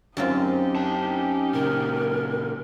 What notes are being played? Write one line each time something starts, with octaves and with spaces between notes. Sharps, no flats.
F#2 C4 D#4 F4 G4
C#4 A5
A#2 C#3 A#4